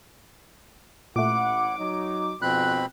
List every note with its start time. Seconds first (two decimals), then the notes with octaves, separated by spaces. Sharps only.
1.16 A1 A#2 A3 E4 F#5 D6
1.78 F#3 D#4
2.42 F2 G#2 B2 C4 B5 F#6